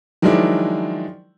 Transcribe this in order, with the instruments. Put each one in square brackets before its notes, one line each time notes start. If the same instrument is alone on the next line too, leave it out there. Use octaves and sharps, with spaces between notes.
[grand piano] D#3 F3 F#3 G#3 D4 E4